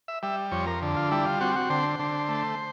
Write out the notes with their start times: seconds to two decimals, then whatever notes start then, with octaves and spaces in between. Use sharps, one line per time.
0.08 E5
0.23 G3 E5
0.52 F2 C#5
0.67 A#4
0.82 D3
0.96 F4
1.11 G3 E4
1.25 F4
1.41 C4 F#4
1.56 F#4
1.70 D3 C5
1.99 D3
2.29 A3